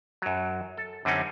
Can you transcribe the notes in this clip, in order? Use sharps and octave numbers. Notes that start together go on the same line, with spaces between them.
F#2 F#3
A4
F#2 D3 G3 C4 C#4 D#4